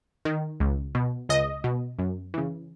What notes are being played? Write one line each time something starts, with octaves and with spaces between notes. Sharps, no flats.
D#3
C#2
B2
C#2 D#5
B2
F#2
C#3 E3